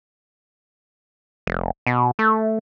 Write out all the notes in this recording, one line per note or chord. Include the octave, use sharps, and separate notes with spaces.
F1
B2
A3